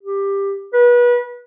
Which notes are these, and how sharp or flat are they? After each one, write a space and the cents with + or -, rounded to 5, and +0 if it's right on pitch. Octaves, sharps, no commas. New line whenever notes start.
G4 +15
B4 -30